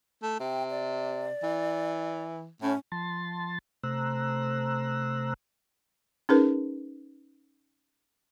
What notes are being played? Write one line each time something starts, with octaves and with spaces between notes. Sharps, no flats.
A3
C3 G5
D5
E3
A2 C#4
F3 A5 C6 A6
C3 A3 C5 A#5 E6 F#6
C#4 D#4 G#4 A#4 B4